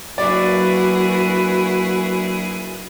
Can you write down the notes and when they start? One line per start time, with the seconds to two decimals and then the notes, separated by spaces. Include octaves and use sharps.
0.18 F#3 A#3 D4 E4 F#4 G#4 B4 D5